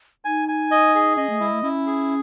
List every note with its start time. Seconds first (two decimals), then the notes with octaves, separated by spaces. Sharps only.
0.25 D#4 G#5
0.48 G#5
0.71 D#5
0.95 G#4
1.17 C#4 D#5
1.30 A3
1.40 G#3 E4
1.53 A3
1.63 C#4 E4
1.87 G#4